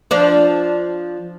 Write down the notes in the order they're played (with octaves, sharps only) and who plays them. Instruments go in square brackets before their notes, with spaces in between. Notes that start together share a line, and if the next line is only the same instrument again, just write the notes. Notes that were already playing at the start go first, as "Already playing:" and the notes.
[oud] F3 D4